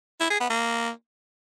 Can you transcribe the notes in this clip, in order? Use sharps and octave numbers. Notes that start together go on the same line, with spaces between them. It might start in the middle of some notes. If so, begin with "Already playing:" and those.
E4
G#4
B3
A#3